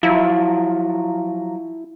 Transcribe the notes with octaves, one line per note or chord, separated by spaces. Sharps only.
F3 F#3 E4